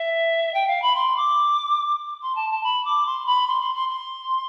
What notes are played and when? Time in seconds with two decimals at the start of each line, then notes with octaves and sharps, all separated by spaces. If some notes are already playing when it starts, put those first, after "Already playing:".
Already playing: E5
0.54 G5
0.67 F5
0.82 B5
0.95 C6
1.16 D6
2.22 C6
2.35 A5
2.50 A5
2.64 B5
2.85 D6
3.06 C6
3.26 B5
3.47 C6
3.62 C6
3.75 C6
3.90 C6